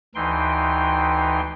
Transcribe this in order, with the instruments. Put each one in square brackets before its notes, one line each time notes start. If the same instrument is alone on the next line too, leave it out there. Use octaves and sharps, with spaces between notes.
[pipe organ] D2 E3 D#4 G5 C6